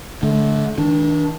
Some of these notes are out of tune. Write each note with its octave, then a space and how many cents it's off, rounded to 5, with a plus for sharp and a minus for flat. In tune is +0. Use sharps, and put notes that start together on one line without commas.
D3 -20 A3 -40
D#3 +45 D4 +5